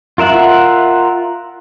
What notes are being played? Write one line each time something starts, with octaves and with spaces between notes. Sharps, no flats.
F4 A#4 E5 F#5